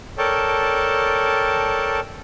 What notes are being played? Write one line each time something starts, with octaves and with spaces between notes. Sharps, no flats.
A4 A#4 C#5 D5 G5 A5